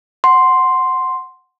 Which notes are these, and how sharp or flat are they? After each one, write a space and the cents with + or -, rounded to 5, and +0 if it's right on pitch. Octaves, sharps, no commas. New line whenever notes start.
F#5 +0 C6 +0